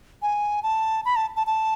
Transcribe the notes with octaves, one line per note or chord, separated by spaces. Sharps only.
G#5
A5
B5
A5
A5
A5